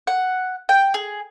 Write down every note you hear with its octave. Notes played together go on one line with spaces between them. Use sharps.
F#5
G5
G#4